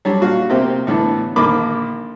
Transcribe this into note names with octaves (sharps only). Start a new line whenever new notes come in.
F#3 G3 D4
A#2 F#4 F5
C3 A#3 C4 G4
A2 D3 E3 B3 D4
A#1 D3 D#3 A#3 B5 D6